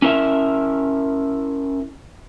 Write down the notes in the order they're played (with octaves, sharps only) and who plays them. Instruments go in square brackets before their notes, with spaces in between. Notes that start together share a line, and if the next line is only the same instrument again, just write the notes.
[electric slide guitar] C#4 E4 A#4 E5